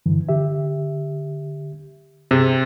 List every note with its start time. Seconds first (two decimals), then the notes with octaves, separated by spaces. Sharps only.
0.06 G2 D3 E3
0.29 D3 G4 E5
2.31 G2 C3 G#4